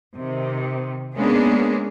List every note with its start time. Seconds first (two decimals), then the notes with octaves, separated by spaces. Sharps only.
0.17 C3 D#3
1.16 G#3 A#3 B3 C#4 D4 G#4